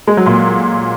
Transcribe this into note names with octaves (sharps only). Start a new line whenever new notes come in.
G#3
F#3
A#2